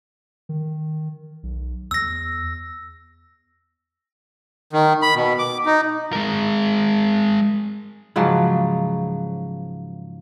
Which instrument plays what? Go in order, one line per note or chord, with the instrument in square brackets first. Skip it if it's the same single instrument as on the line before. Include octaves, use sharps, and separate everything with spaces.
[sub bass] D#3
B1
[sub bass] E2 [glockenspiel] E6 A#6
[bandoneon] D#3
B5
B2
D6
D#4
[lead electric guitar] G#3 A#4
[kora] G#2 C#3 F3 F#3